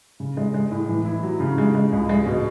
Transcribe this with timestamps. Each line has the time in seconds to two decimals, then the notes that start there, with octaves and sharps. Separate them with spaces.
0.20 C#3
0.37 G#3
0.54 G#3
0.71 A2
0.89 E3
1.05 E4
1.23 F#3
1.40 C#3
1.58 G#3
1.75 G#3
1.92 C#2
2.09 G#3
2.26 B2